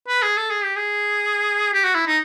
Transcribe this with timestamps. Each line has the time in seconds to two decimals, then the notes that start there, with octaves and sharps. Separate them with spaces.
0.08 B4
0.22 G#4
0.37 A4
0.50 G#4
0.64 G4
0.76 G#4
1.73 G4
1.84 F#4
1.95 E4
2.07 D#4